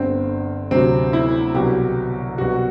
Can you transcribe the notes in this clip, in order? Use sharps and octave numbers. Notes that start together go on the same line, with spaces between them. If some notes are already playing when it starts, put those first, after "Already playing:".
Already playing: G1 G2 D3 C4
D2 C3 F#3 C4
E4
C2 B2 F#3 G4
C2 B2 F#3 F#4